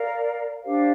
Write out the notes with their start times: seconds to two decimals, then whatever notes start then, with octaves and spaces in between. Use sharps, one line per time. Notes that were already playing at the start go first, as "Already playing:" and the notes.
Already playing: A#4 D5 F5 A#5
0.63 D4 G4 C5 F5